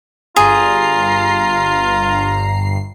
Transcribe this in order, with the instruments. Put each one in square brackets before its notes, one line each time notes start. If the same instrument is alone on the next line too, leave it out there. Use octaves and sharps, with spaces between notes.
[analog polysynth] G1 G2 C7 [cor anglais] F4 [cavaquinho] G#4 [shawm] A#5